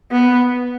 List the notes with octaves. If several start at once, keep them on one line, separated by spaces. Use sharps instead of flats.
B3